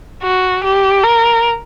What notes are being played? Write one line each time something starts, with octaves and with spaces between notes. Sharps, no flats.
F#4
G4
A#4